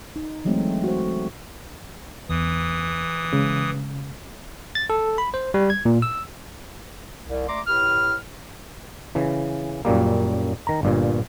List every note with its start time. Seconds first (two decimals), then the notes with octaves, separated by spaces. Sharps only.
0.16 D#4
0.45 E3 F#3 G#3 A3 C4
0.84 F#4 C5
2.29 E2 E3 D#6
3.33 C#3 G#3
4.75 A6
4.90 A4
5.18 B5
5.34 C5
5.54 G3
5.70 G#6
5.85 A#2
6.02 E6
7.26 C2
7.48 A3 D5 A#5 C6 D6
7.67 A2 G4 B4 F6
9.15 C#3 E3
9.85 F#2 A#2 G3 A#3
10.67 D#3 A#5
10.83 G1 G2 A#2